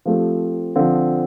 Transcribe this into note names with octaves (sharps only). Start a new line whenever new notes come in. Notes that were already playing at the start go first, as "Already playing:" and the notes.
F3 A3 C4 G4
D3 F3 C4